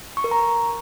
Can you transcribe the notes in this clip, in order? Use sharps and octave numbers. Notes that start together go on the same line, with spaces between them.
C#6
A#4
A#5